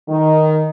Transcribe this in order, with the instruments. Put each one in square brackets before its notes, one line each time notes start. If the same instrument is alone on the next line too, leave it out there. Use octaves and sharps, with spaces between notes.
[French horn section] D#3